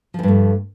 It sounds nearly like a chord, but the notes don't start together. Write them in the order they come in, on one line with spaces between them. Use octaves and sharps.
F3 E2 G2 A3